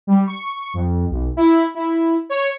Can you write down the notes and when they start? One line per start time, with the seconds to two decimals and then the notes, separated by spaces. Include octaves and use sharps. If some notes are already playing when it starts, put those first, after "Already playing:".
0.07 G3
0.27 C#6
0.74 F2
1.10 B1
1.37 E4
1.75 E4
2.30 C#5